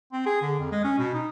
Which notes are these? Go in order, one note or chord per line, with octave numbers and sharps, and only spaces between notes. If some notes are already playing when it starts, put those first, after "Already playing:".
C4
G#4
D3
F2
G#3
C#4
B2
D#4